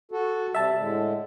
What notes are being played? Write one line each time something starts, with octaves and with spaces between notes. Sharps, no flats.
F#4 A4
C3 G3 E5 A5
A2 D3 G#3